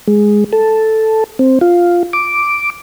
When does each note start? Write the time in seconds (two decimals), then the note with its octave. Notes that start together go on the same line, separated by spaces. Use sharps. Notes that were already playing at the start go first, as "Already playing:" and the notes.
0.08 G#3
0.53 A4
1.39 C4
1.61 F4
2.13 D6